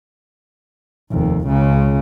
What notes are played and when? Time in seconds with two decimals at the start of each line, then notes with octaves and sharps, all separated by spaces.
1.12 F1 D#2
1.47 C#2 C#3